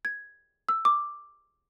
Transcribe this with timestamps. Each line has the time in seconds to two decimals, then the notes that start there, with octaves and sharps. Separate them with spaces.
0.05 G#6
0.69 E6
0.85 D6